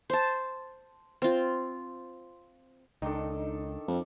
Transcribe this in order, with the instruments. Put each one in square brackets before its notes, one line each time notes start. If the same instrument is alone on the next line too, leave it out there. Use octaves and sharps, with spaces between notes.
[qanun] C5 A5
C4 F4
[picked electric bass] C#2 [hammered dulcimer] D#3 D4 A4 [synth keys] D#4
[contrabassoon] F2